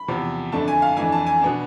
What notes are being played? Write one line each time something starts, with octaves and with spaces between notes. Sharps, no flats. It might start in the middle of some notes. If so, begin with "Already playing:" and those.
Already playing: B5
E2 C3 F3
F2 D3 A3 D4 A5
G#5
F5
F2 E3 A3 D4 G#5
A5
G#5
B2 B3 D4